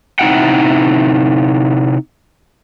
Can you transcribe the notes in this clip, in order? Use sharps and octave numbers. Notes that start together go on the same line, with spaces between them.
C3 D#4 E4 F#5 G5